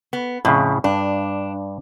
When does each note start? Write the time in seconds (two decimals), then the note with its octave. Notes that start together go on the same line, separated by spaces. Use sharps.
0.13 B3
0.45 F2 A2 C#3
0.84 G2 D4